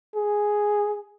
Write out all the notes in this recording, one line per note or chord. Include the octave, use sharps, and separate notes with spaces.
G#4